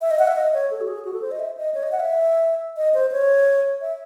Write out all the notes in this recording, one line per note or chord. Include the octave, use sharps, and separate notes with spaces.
E5
D#5
F#5
E5
D#5
C#5
A4
F#4
G#4
F#4
A4
C5
D#5
E5
D#5
C#5
D#5
F#5
E5
D#5
C5
C#5
E5